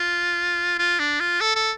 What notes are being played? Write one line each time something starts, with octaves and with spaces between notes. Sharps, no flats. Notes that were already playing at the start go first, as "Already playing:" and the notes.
Already playing: F4
F4
D4
F4
A4
A4